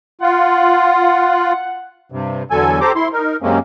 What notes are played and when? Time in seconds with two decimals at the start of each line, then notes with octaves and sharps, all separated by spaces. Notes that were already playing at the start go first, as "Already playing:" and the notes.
0.21 F4 F#5
2.12 G2 C3
2.51 E2 D3 F#3 A4 G#5
2.81 G4 A4 C5 A#5 D6
2.96 E4 C6
3.13 D#4 A#4
3.42 F#2 C3 G#3 A#3 C4 C#4